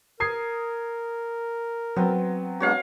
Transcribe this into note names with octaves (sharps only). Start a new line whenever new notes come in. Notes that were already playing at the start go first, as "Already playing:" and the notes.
A#4 D#6 G#6 C7
F#3 B3 C4
G#3 B3 D4 F#4 C#5 F5